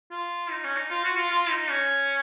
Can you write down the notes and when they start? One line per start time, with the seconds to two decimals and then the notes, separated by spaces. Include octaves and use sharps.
0.11 F4
0.51 D#4
0.64 C#4
0.77 D#4
0.90 F4
1.05 F#4
1.17 F4
1.31 F4
1.50 D#4
1.70 C#4